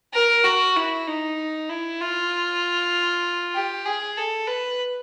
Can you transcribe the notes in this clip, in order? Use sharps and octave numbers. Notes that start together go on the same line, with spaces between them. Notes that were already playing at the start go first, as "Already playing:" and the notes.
A#4
F#4
E4
D#4
E4
F4
G4
G#4
A4
B4